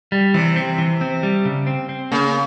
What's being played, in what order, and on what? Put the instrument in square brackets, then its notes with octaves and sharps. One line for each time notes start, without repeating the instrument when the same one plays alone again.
[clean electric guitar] G3
[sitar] C3 [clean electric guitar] E3
[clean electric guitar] C4
E3
C4
G3
C#3
C4
C4
[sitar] C#3 [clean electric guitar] A#3